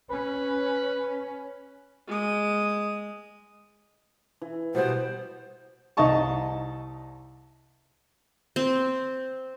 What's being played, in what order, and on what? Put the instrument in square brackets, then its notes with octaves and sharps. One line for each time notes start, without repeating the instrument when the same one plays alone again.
[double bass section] C#4 [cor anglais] B4
[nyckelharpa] G#3 D#6
[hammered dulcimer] E3
[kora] B2 G3 B3 [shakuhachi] C5
[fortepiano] C2 D#4 D#5 A5 C#6
[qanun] C4